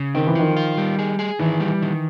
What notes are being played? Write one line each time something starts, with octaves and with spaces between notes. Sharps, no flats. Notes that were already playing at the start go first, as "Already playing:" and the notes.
Already playing: C#3
D#3 C4
E3
D#3 F3
F4
G3
G#4
G#4
D#3 E3
G3
D#3